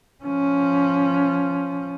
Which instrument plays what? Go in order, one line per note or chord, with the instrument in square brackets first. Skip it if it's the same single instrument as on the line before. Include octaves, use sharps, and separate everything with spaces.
[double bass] F3 C#4